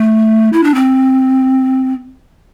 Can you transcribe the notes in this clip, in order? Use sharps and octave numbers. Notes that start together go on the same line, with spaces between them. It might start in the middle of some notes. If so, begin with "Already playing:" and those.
Already playing: A3
E4
D4
C4